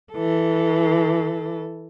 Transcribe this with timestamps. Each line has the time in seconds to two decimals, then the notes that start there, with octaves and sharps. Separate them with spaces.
0.13 E3 A4